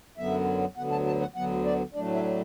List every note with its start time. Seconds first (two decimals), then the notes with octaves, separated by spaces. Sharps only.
0.18 F#2 D3 F#3 B3 E5
0.77 D2 D3 F#3 B3 F#5
0.92 A5
1.07 A5
1.21 F#5
1.36 D2 D3 F#3 B3 F#5
1.65 D5
1.94 A2 F#3 A3 D4 D5
2.14 E5